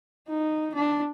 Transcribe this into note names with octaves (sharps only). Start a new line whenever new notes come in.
D#4
D4